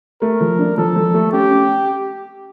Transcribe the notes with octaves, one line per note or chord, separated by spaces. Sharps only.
A3 A#4
F3
D4
F3 A4
F3
A3
C#4 G4
C#4